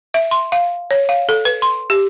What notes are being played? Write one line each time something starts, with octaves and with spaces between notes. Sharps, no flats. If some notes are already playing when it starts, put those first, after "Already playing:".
E5
C6
F5
C#5
F5
A4
B4
C6
G4